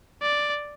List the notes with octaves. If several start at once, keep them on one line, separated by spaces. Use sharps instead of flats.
D5